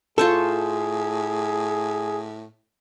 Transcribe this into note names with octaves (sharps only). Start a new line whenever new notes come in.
A2 F4 G#4 A4 C5 C#6